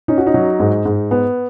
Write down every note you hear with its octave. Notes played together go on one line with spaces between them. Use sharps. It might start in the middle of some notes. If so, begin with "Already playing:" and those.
C#4 D#4
F#4
D#4
F#3
G#2
G#2
B3